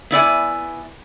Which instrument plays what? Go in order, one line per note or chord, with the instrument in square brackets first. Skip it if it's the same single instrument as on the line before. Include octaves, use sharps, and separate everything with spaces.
[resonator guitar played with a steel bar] B3 E4 D5 G#5